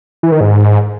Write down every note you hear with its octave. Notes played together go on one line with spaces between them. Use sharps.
E3
D#3
G#2